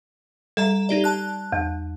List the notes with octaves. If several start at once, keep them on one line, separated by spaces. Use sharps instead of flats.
G3 A4 E5 A#5
D#4 G4 D5
A5 F#6
E2